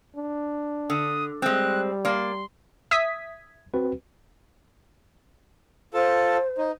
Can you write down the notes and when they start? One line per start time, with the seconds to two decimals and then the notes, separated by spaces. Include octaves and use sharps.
0.16 D4
0.90 D3 D#6
1.42 G3 G#3 C4 F#6
2.05 A#3 D5 C6
2.91 E5 D#6 G#6 B6
3.74 C4 F#4 B4
5.94 F4 A4 C5 A5
6.58 D#4